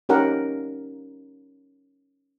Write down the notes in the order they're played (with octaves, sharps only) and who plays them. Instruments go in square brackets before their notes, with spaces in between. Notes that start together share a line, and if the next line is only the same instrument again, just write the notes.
[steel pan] C#4 D#4 G4 A#4 F#5